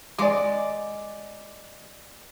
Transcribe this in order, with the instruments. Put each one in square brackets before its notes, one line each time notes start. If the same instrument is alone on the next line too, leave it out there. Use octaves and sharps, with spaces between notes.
[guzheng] G#3 [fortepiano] D5 D6